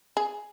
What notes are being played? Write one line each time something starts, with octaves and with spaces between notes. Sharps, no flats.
G#4